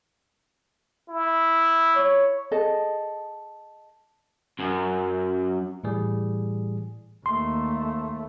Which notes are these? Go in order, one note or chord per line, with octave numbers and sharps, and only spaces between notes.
E4
C#5
G#4 A4 D#5 A5
F#2
A2 E3 G3 G#4
D#2 A3 C6